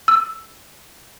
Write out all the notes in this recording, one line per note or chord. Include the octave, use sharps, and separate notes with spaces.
E6